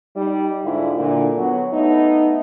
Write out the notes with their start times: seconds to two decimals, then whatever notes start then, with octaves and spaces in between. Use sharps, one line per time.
0.17 G3 D#4
0.65 G#2 D3 D4 E4 F4
0.98 A#2 D3
1.38 F#3 B3
1.73 A3 B3 D#4